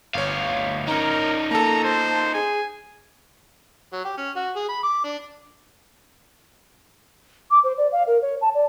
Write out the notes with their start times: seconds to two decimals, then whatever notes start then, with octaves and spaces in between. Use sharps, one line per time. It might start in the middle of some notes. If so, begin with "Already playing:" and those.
0.14 G1 D2 C#5 F5
0.88 C#4 D#4 A#4 A#5
1.51 A#3 A4 A5 A#5
1.84 C5 A5
2.34 G#4 G#5
3.93 F#3
4.04 G4
4.17 C#4
4.36 F#4
4.56 G#4
4.69 B5
4.83 D6
5.04 D4
7.50 D6
7.63 C5
7.77 D5
7.91 F5
8.06 A#4
8.21 C#5
8.41 A5
8.54 D5